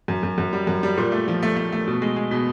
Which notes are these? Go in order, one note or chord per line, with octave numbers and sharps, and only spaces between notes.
F#2
F#2
F#2
G3
F#2
G3
A#2
A3
F3
A3
A3
A3
B2
G#3
G#3
B2